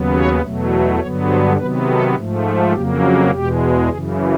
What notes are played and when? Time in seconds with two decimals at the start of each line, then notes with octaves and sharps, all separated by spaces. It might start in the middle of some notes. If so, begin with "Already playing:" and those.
Already playing: D#2 C#3 F#3 B3
0.12 C#5
0.42 E2 B2 F#3 A3
0.99 G2 D3 F#3 B3 C#5
1.28 C5
1.57 C3 D#3 F#3 B3 B4
1.86 A4
2.15 G#2 F3 A3
2.44 G#4
2.73 F2 C#3 F#3 A#3 G4
3.03 F#4
3.31 E2 B2 G#3 G4
3.89 F#2 C#3 E3 G#4